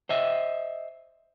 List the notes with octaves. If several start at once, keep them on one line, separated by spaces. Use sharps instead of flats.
C5 D#5 E5